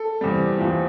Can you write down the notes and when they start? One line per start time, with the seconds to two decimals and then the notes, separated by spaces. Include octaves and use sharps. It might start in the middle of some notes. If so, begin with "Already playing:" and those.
Already playing: A4
0.21 E2 C3 G3
0.59 E2 C3 F3 G4